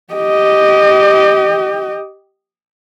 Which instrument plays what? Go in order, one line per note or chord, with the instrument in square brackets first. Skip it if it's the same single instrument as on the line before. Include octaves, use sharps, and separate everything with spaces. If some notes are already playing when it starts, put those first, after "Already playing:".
[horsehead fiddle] G4 D#5